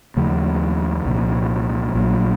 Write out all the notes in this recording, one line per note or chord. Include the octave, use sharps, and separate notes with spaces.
D#2 C#3 F3 A3
C2 A#2 F3
A#1 A#2 F#3 A#3